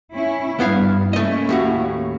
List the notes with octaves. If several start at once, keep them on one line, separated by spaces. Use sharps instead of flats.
C#4 E4
G2 B3 E4 F5
A3 A#3 C#4 E4 D#5
D#2 A2 F#4